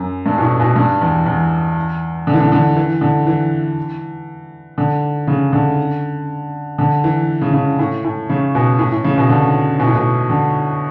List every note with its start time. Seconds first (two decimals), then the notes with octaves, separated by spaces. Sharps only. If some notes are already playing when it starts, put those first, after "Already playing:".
Already playing: F#2
0.26 G2
0.38 B2
0.42 A2
0.60 B2
0.76 G2
1.01 E2
1.26 E2
2.27 D3
2.34 E3
2.40 D3
2.52 D3
2.77 E3
3.01 D3
3.27 E3
4.78 D3
5.27 C#3
5.53 D3
6.78 D3
7.04 E3
7.41 C#3
7.54 C#3
7.79 A2
8.04 A2
8.29 C#3
8.55 B2
8.79 A2
8.92 A2
9.04 C#3
9.18 B2
9.30 D3
9.80 B2
9.87 A2
9.95 B2
10.30 D3